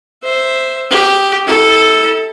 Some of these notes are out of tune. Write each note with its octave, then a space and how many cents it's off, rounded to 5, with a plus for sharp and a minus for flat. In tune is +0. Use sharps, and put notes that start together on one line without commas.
C5 +0 E5 +0
G4 +0 D#6 +15
E4 -35 A4 +0